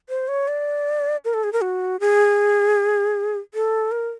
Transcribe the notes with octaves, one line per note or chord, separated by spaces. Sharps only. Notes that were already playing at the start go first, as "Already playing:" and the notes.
C5
C#5
D5
A#4
A4
G#4
A#4
F#4
G#4
A4
A#4